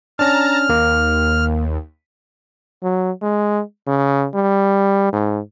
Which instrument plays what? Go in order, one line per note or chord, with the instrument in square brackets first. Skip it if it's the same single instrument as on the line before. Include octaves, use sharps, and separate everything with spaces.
[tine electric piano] C#4 D4 [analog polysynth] A5 A#5 [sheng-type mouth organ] F6
[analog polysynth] D#2 [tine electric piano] A#3
[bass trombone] F#3
G#3
C#3
G3
G#2